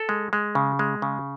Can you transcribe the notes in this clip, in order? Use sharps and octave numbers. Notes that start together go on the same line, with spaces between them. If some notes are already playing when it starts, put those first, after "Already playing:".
Already playing: A4
G#3
G#3
C#3
G#3
C#3